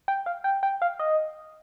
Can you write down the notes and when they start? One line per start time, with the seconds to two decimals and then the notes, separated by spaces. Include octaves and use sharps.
0.08 G5
0.26 F5
0.44 G5
0.63 G5
0.82 F5
1.00 D#5